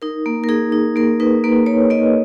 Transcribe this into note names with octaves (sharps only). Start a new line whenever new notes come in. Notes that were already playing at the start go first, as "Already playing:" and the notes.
D#4 A#4
A#3
A#4
D#4 G#4
D#4
A#3 A#4
D#4 B4
A#3 B4
A#3 C#5
A#3 D#5